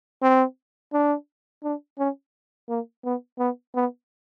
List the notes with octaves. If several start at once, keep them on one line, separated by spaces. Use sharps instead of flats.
C4
D4
D4
C#4
A#3
B3
B3
B3